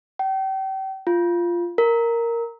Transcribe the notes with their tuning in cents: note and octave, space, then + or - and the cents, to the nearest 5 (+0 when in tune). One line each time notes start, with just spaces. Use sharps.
G5 -35
F4 -10
A#4 -5